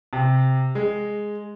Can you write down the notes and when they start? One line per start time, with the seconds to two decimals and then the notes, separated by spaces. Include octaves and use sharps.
0.13 C3
0.75 G#3